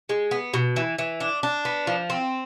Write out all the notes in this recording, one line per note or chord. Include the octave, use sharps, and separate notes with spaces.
G#3
B3
B2
E3
E3
D4
D4
B3
F3
C4